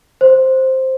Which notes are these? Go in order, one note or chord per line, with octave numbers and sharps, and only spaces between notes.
C5